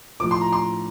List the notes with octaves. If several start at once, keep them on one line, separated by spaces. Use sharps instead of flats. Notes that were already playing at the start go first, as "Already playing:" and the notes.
A2 F3 D6
C6
A#5
C6